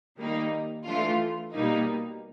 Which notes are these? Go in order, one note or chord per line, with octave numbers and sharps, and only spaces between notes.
D#3 G3 A#3 D#4
E3 A3 D4 F4
B2 G3 A#3 D#4